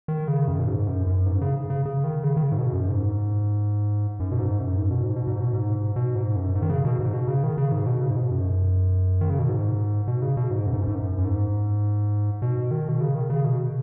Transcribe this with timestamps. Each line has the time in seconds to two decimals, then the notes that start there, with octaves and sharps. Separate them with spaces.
0.08 D#3
0.28 C#3
0.48 F#2
0.59 B2
0.67 G#2
0.87 F#2
1.07 F#2
1.26 G#2
1.41 C#3
1.70 C#3
1.85 C#3
2.04 D#3
2.24 C#3
2.37 D#3
2.43 C#3
2.52 G#2
2.59 B2
2.73 F#2
2.88 G#2
4.20 F#2
4.32 B2
4.39 G#2
4.59 F#2
4.78 G#2
4.91 B2
5.03 G#2
5.16 B2
5.27 G#2
5.40 B2
5.53 G#2
5.96 B2
6.15 G#2
6.36 F#2
6.55 G#2
6.62 D#3
6.70 C#3
6.85 B2
6.99 G#2
7.14 B2
7.27 C#3
7.43 D#3
7.58 C#3
7.72 G#2
7.86 B2
8.01 C#3
8.10 G#2
8.16 B2
8.31 F#2
9.21 D#3
9.30 C#3
9.39 B2
9.49 G#2
10.07 B2
10.22 C#3
10.37 B2
10.51 G#2
10.66 F#2
10.73 G#2
10.81 F#2
10.88 G#2
10.95 F#2
11.18 F#2
11.25 G#2
12.42 B2
12.71 D#3
12.89 B2
13.01 C#3
13.15 D#3
13.30 C#3
13.44 B2